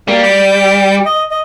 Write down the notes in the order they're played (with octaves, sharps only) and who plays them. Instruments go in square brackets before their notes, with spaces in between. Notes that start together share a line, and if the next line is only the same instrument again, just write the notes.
[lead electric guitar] G3 [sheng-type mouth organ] A#3
[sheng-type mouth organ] D6 G6
D#5
D#5